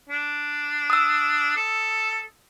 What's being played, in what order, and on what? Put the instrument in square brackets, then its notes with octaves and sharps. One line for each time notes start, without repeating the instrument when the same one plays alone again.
[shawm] D4
[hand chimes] D#6 E6
[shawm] A4